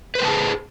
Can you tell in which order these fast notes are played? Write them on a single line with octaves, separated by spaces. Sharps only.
B4 C5 G5 A5 G#4